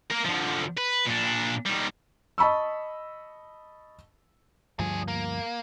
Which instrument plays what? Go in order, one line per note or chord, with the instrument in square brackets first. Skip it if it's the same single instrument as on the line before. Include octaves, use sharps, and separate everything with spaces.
[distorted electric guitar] A#3 A#4
D3 F3
B4
A#2 D4
D#3 G3
[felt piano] D#5 A5 B5 C#6 E6
[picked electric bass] D2 G2 F3 [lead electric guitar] D4 G#4
[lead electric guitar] A#3